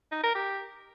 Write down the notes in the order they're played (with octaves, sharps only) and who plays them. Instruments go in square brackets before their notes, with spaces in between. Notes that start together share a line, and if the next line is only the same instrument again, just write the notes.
[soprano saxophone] D#4
A#4
G4